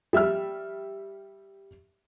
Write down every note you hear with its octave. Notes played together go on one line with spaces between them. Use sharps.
G3 E5 E6 F6